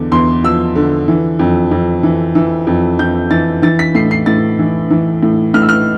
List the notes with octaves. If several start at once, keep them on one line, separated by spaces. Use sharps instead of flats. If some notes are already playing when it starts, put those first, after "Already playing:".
Already playing: E2 D3
E2 C6
F3 E6
D3
E3
F2
F2
E3
E3
F2
F2 G6
E3 A6
E3 A6
B6
A2 C7
C7
A2 A6
E3
E3
A2
A2 F6
E6
F6